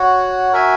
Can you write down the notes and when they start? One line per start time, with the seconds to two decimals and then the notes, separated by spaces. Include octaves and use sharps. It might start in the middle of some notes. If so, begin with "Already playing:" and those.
Already playing: F#4 C#5 F#5
0.53 F#4 A#4 E5 G#5